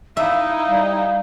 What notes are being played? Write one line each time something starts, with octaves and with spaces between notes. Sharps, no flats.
D#4 E4 E5 F5
G3